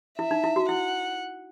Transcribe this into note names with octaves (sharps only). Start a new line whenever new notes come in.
E4 E5
D#4
E4
F#4
E4 F#5